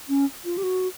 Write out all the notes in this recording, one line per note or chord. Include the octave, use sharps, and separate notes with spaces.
C#4
F4
G4
F#4